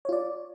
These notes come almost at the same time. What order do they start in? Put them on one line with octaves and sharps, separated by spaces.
C#5 F4 D5